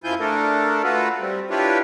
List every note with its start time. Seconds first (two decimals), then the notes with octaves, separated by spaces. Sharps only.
0.04 F#2 F3 E4 F4 G#5 G6
0.20 A3 D4 A4 A#4
0.84 A3 F4 F#4 A4 B4
1.20 G3 C4
1.50 D4 E4 F4 G4 B4 C#5